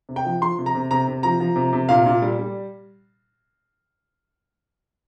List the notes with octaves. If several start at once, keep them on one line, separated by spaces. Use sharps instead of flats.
C3
G5
F3
F3 C6
C3
A#5
C3
C3 A#5
C3
F3 A#5
F3
C3
C3
A#2 F5
A#2
G3
G3